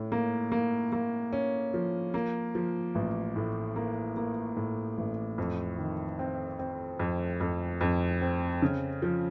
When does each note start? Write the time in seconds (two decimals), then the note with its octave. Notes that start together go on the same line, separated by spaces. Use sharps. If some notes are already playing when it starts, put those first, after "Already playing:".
Already playing: A2 C#4
0.12 A#3
0.52 A#3
0.92 A#3
1.33 C#4
1.74 F3
2.14 A#3
2.55 F3
2.95 A1
3.36 A2
3.76 A#3
4.17 A#3
4.57 A2
4.98 A1
5.38 F2
5.79 D#3
6.19 C4
6.59 C4
6.99 F2
7.41 F2
7.81 F2
8.22 C4
8.62 C#3
9.02 F3